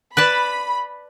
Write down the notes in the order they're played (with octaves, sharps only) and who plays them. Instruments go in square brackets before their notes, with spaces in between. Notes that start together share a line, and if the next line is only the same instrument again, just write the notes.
[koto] B4 D5 A5 [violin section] B5